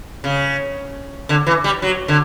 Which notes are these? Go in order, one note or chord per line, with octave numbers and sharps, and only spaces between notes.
C#3
D3
E3
G3
F#3
D3